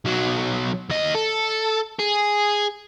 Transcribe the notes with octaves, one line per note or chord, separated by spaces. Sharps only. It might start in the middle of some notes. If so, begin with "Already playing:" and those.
B1 F#3
D#2 D#5
A4
G#4